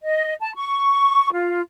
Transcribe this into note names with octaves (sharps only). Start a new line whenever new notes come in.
D#5
A5
C#6
F4